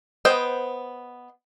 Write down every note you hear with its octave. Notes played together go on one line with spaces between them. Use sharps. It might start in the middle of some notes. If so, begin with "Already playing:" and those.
B3 C5 D#5 G5